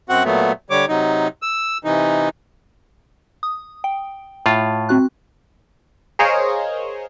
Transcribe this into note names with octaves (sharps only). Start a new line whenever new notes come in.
F#2 C4 F#4 F#5
A#2 F#3 A3 B3
D3 G3 C#5 D6
C3 F#3 D#4
E6
C3 E3 D#4
D#6
G5
A2 F4
C4 F#4 F#6
G#4 A#4 C5 C#5 D#5 F5